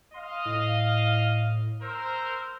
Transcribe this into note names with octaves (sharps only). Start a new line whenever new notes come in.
D#5 F5 C6
A2
A#4 C5 E6